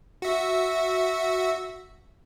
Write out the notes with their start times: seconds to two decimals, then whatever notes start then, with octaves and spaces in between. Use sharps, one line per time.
0.22 F#4 E5